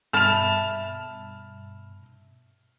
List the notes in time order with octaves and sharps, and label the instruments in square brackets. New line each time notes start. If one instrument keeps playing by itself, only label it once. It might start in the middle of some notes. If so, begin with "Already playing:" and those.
[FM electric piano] G2 B2 [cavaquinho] E5 A5 B5 [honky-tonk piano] F6 F7